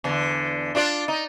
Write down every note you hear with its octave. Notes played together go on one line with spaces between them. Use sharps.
E2 D3
D4 F4 D5
D#4